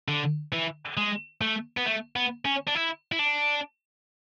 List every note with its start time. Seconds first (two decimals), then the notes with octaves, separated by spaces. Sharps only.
0.08 D3
0.52 E3
0.97 G#3
1.41 A3
1.77 B3
1.86 A3
2.16 B3
2.45 C#4
2.68 D4
2.75 E4
3.12 E4
3.19 D4